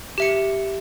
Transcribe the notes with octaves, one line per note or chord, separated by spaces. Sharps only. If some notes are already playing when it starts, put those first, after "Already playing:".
G4 E5 C#7